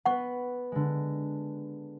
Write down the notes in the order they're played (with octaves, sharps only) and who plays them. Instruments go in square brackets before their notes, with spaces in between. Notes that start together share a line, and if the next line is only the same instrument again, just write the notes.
[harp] B3 B4 [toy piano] F#5 C#6
[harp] D3 G#3